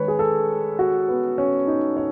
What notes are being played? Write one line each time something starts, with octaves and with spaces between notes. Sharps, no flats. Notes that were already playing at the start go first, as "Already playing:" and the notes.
Already playing: D#3 G#3 B4 C#5
G#4
A4
F#4
B3
C#4
D#4
C#5